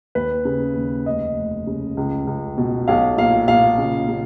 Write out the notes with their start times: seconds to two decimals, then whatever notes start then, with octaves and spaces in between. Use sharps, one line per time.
0.15 D#2 B4
0.45 C#3
0.76 D#2
1.06 F1 D#5
1.36 F1
1.67 C#3
1.97 C#2
2.27 C#2
2.58 B2
2.88 B1 F5
3.17 A#2 F5
3.48 A#2 F5
3.78 C#3
4.09 C#3